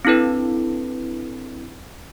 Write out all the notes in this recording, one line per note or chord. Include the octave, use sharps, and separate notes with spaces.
C4 D4 E4 A4 B4